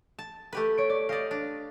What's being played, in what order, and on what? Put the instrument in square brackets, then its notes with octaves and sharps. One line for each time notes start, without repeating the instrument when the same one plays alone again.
[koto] A5
A3 G4 B4
[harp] C#5 D7
D5
[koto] G4 D5 [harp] D#5 F5
[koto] D4